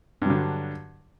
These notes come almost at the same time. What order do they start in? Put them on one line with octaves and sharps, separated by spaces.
G2 F#3 D3